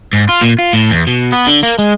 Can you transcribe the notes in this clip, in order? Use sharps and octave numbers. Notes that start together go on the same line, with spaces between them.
G#2
F4
A#2
F4
A2
E2
B2
B3
D3
A#3
G#3